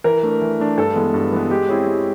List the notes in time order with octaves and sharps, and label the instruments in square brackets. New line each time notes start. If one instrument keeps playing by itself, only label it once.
[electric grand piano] E3 [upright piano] A#4
[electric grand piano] A3 D4
E3
A3 D4
[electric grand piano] G2 [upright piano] A4
[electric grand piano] E3 G#3 B3
G2
E3 G#3 B3
[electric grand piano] G#3 [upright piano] G4
[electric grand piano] C4 E4 G#4 C#5
G#3